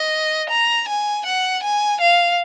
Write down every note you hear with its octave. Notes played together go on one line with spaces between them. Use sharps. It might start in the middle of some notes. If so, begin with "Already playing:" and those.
Already playing: D#5
A#5
G#5
F#5
G#5
F5